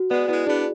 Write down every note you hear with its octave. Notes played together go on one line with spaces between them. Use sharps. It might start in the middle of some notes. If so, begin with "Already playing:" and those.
Already playing: F#4
G#3 B3 D5
G#3 B3 E4
B3 D4 G#4